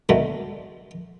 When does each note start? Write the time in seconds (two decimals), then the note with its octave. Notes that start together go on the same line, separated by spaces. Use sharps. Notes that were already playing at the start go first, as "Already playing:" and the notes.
0.09 B2 D3 D#3 G#3 A3